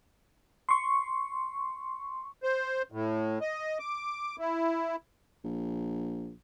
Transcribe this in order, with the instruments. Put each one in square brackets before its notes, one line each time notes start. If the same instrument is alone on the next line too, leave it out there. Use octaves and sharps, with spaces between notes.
[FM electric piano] C6 C#6
[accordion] C5
A2
D#5
D6
E4
[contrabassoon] A#1